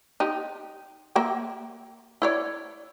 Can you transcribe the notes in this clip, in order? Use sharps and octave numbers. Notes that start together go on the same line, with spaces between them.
D#4 G4
A#3 E5 G5
E4 C#5 D5